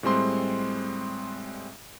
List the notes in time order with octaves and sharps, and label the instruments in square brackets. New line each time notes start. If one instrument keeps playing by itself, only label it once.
[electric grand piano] A2 G3 G#3 C4 C6